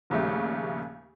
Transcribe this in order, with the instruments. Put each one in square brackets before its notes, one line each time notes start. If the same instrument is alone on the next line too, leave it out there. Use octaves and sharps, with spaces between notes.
[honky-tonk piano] A#1 D#2 C#3 G3 A3